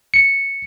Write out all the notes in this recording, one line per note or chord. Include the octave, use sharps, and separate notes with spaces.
C#7